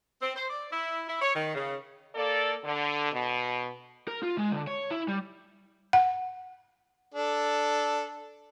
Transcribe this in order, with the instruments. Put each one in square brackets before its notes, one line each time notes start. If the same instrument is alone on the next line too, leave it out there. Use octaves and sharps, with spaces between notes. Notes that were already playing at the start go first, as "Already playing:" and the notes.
[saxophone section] C4
C5
D5
E4
E4
C#5
D#3
C#3
[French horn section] A#3 A4 D5
D3
B2
[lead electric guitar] A#4
F4
G#3
D3
C#5
E4
G3
[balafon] F#5
[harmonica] D4 A4